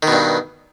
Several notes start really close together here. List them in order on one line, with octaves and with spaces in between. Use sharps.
D#3 B2 G2